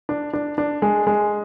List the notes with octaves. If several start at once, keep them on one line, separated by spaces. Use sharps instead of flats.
D4
D4
D4
G#3
G#3